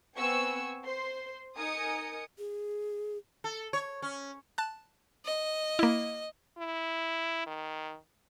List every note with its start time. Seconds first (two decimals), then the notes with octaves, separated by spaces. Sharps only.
0.18 B3 C4 G#5 C#6 E6
0.86 C5 C6
1.56 D#4 A#4 G#5 D#6 C#7
2.38 G#4
3.44 A4
3.73 C#5
4.02 C#4
4.58 A5 F#6
5.25 D#5
5.79 A#3 E4
6.58 E4
7.47 D#3